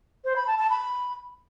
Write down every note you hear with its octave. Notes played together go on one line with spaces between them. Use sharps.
C5
B5
A5
A5
B5